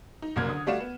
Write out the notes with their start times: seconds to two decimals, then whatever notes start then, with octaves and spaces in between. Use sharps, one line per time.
0.22 D#4
0.36 F#1 C2 A#3 F6 G#6
0.49 D3 D#6
0.67 G3 A3 F#4 D5 F5 E7
0.80 B3